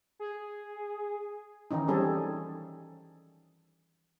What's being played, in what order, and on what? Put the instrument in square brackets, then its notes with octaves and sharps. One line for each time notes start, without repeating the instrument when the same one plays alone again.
[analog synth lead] G#4
[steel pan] D#3 E3 C#4 D#4
F#3 G3 C4 C#4 G#4 A4